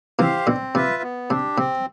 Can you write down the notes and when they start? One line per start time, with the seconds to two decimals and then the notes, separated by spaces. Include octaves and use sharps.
0.19 C3 E3 G4 C5 F5
0.47 B2 D3 C4
0.75 C3 F4 B4 E5
1.03 B3
1.30 C3 D4
1.34 G4
1.58 C3 C4